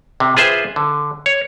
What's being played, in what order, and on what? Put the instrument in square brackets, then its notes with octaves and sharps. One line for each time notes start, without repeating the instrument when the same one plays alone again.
[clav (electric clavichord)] C3
F4 G#4 B4 C5 E5
D3
C#5